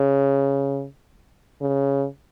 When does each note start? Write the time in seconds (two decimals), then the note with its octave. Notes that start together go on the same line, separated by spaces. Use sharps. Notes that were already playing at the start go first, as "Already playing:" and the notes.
Already playing: C#3
1.61 C#3